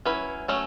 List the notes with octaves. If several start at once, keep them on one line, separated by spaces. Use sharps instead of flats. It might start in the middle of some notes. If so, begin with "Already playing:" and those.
F#3 C#4 E4 B4
F#3 A3 C#4